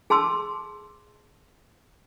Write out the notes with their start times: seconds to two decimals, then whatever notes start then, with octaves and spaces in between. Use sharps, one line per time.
0.10 G#4 A5 C6 E6